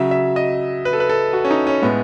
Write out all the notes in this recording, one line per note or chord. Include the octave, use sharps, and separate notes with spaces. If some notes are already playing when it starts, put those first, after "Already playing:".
Already playing: C#3 F#3 E5
E5
D#5
B4
A4
B4
A4
F#4
C#4
D#4
C#4
A2 G#3 B3